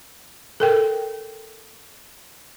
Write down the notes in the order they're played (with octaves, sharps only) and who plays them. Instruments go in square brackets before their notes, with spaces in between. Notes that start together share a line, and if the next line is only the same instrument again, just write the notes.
[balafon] A4 A#4 G5